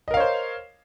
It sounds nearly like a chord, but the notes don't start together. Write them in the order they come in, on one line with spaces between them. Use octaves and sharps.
D#5 A#4 F5 C#5 C5